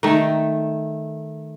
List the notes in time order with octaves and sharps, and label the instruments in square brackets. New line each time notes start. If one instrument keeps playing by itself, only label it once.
[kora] D#3 A3